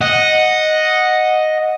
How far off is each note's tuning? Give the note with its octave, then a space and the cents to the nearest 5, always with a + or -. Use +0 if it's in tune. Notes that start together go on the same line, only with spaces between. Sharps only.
D#5 +0 F#5 -10